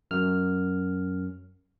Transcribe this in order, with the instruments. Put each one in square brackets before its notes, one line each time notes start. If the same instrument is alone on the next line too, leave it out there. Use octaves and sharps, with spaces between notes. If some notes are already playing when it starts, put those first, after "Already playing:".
[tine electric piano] F#2 F6